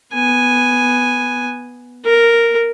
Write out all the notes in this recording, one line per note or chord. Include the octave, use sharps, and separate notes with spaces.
B3 G#5
A#4